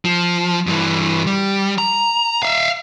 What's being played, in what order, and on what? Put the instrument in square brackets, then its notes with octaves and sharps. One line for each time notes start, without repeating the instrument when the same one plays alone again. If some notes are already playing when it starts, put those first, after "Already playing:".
[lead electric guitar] F3
G2 E3
G3
A#5
E5 F5